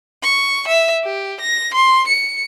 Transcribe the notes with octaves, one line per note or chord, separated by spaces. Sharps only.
C#6
E5
G4
A#6
C6
C#7